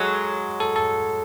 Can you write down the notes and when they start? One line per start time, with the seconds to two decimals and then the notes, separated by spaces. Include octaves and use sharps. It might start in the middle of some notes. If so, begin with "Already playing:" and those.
Already playing: F#3 G#3 A4
0.60 A4
0.76 A4